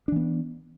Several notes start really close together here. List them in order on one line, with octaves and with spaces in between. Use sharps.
D4 E3 B3